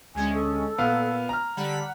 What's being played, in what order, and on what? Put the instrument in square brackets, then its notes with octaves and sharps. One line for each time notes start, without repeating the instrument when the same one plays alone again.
[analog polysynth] D2 G#3 C#4 [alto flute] G#5
[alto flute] A4
[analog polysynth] A#2 [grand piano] B3 F5
[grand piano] A#5 F6
[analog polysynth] D3 G3 B5 [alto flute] F#5